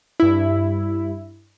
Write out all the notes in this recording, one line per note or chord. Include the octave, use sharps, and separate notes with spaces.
G2 E4